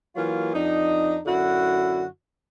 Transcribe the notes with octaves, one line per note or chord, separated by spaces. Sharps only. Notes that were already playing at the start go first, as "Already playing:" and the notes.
E3 F#3 A#3 F4
F2 D4 D#4
F#2 D3 E4 F#4